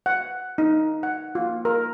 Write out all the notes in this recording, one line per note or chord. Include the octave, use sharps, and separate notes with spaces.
F#5
D#4
F#5
F4
A#4